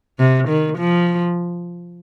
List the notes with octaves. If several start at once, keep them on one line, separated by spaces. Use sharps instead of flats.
C3
D#3
F3